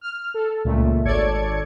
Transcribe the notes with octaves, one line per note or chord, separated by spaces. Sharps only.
F6
A4
C#2 A#2 A3
G#1 A4 C#5 D5 G#6 C#7